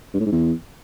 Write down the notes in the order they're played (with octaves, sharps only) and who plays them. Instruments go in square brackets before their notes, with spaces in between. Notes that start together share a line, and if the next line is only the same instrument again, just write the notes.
[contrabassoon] G2
A2
G#2
E2